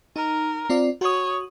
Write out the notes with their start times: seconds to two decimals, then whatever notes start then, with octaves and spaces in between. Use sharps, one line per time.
0.16 D#4 A#4
0.70 C4 F4 D5
1.01 F#4 C#5 D#6